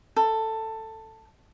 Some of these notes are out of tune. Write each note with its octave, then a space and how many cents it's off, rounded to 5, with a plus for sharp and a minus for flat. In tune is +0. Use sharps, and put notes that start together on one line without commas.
A4 +10